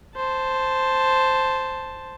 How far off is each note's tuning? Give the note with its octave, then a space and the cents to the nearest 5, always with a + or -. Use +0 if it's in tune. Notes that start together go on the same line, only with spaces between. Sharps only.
C5 +0 A5 +0